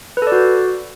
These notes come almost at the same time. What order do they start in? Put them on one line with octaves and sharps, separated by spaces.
B4 A4 D5 F#4